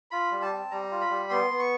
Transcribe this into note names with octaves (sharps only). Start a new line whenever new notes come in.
F4 B5
G3
A5
C4
G3 A#5
F4
B5
G3
B3 C6
B3
C#6